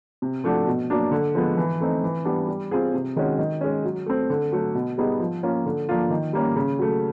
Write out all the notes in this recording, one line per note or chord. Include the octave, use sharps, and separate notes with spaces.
C3
F3 A3 D4 F#4
B2
F#3 A#3 D4
D3
F3 G#3 B3
E3
A3 C4 D#4
E3
G3 B3 D4
G3
C4 F4 G#4
C3
D#3 G#3 C#4 F#4
D#3
G#3 C#4
F#3
A3 C4
D3
F#3 A3
B2
G3 B3 D#4 G#4
F3
A#3 C#4 F4
D3
F3 A#3 D4 F4
D#3
G3 A#3 C#4
C#3
F#3 A3